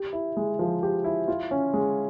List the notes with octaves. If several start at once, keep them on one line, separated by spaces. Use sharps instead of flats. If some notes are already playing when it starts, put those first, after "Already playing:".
Already playing: G4
E4
G#3
F3
G4
E4
F4
C#4
G#3